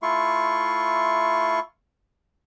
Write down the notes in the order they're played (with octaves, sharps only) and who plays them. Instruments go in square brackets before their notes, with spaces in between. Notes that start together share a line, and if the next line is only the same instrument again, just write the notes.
[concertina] A3 E4 F4 C6 C#6